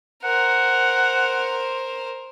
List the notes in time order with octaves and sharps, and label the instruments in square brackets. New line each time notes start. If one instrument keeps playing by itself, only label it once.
[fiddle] A#4 C5 [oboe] F#5